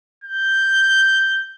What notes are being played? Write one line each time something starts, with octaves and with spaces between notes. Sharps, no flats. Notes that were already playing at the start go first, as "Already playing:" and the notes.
G6